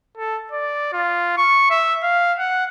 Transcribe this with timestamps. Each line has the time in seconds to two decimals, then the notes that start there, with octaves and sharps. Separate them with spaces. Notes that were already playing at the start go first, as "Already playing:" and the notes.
0.17 A4
0.52 D5
0.93 F4
1.37 C#6
1.70 E5
2.03 F5
2.39 F#5